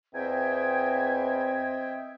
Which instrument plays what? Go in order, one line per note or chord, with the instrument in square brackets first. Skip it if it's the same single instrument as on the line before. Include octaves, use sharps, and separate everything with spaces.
[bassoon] E2 [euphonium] C4 [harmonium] D#5 E5 G5 [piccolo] G#6